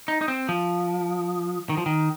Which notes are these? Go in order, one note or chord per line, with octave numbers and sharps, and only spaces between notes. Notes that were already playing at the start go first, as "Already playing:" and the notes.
D#4
D#4
C4
F3
D#3
F3
D#3